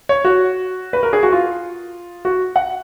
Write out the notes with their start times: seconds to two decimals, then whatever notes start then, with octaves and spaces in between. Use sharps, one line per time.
0.09 C#5
0.25 F#4
0.93 B4
1.03 A#4
1.13 G#4
1.23 F#4
1.32 F4
2.25 F#4
2.56 F#5